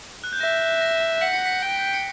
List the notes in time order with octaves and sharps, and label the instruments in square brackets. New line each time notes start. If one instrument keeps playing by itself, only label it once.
[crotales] F#6
G6
[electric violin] E5 [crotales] A#6
[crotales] A#6
[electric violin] F#5 [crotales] B6
[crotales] C#7
B6
[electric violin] G5
[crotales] C#7